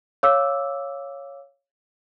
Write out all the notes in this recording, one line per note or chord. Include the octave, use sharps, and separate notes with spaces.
C#5 F5 D6 E6